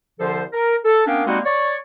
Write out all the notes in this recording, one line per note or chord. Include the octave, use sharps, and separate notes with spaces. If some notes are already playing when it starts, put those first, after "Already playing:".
C2 D3 F3 A4 C5
A#4
A4
A#3 B3 C#4 D4 F5 G5
G3 G#3 A#3 C4 D#4 F#4
C#5 D5 C#6